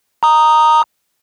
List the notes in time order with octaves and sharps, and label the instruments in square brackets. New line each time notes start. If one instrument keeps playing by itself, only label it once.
[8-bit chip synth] A#5 D#6